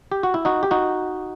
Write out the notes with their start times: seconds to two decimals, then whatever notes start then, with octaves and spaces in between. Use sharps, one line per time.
0.12 G4
0.23 F#4
0.34 E4
0.45 D#4 F#4
0.63 G4
0.71 D#4 F#4